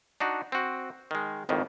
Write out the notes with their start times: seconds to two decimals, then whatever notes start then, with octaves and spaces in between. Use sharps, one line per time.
0.20 D4 D#4 F#4
0.52 C4 F#4
1.11 D#3 G#3
1.49 G#1 F2 A2 D#3